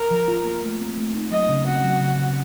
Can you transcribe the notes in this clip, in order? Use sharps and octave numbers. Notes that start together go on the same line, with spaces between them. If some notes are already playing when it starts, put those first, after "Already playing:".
Already playing: A#4
F3
F4
A#3
A3
C4
A3
D#4
F#3 D#5
C#3
C4 F#4
F#3
C#3
C#3